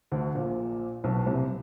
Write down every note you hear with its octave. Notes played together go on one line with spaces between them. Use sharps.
D2 D3
A#1 A#2
B1 B2
C2 C3